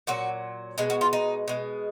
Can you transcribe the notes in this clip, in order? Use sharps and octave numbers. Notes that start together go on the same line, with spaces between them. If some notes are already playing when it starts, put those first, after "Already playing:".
A#2 F#3 F#4
B2 G#3 G#4
F#4
F4
D#4
B2 G#3